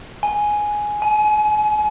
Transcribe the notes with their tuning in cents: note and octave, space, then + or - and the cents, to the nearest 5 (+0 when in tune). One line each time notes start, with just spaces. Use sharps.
G#5 +5
G#5 +35